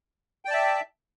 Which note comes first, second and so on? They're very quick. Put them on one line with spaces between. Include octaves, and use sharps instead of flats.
G5 D5 A5 E5